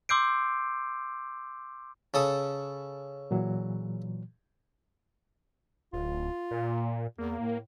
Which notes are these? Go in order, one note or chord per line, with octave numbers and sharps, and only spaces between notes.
C6 D6 E6 G6 C7 D7
C#3 A4 D#6
A#2 E3 F#3
D1 F4
A#2
E2 A#3
A2